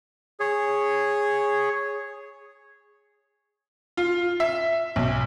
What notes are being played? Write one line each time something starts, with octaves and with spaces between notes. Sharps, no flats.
G#4 C#5
F4
E5
B1